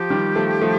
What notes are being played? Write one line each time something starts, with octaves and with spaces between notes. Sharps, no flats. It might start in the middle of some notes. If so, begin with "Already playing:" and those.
Already playing: F3 G4
D#3 G3
F3 A3
F3 A3